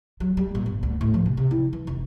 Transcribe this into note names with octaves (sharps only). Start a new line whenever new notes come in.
F#3
G3
A#2
G1
D2
A2
F3
C3
C3
E4
E3
F1